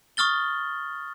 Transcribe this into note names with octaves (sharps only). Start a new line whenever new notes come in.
C#6 D#6 F6 A6 G7